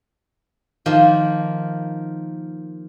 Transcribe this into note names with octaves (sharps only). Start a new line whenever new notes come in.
D#3 F3 A#3